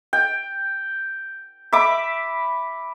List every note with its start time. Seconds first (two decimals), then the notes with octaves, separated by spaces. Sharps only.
0.13 G5
1.73 E5 B5 D6